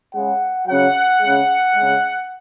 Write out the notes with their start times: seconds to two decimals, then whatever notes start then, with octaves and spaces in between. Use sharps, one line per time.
0.13 C#3 G#3 F#5
0.67 C#3 F#3 F#5
1.20 G#3
1.25 C#3
1.75 C#3 G#3